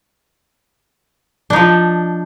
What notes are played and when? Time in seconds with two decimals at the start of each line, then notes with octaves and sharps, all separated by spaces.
1.50 D4
1.53 D#4
1.56 F3